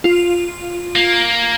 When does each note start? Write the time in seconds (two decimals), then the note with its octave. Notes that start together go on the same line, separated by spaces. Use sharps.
0.04 F4
0.96 A#3